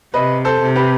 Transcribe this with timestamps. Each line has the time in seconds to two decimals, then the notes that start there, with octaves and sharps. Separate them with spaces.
0.14 C3 B4 D#5
0.45 A4 C5
0.60 C3
0.76 G4 B4